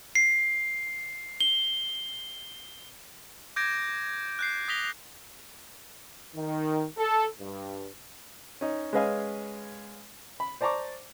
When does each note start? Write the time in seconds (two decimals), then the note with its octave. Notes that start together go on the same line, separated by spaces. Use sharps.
0.15 C7
1.41 G7
3.56 D6 G6 G#6 A#6 D7
4.39 F#6 G6 C7
4.68 D#6 A#6 B6 F7 G7
6.36 D#3
6.98 A4
7.40 G2
8.61 C#4 D#4
8.93 G#3 C#4 B4 D#5 F5 G#5
10.40 B5
10.61 C5 D5 A5 A#5 C#6 D6